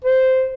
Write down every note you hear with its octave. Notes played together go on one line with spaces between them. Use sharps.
C5